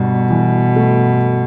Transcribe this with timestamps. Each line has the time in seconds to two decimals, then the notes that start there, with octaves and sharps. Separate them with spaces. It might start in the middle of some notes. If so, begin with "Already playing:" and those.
Already playing: G1 G2 B2
0.30 E3
0.76 A3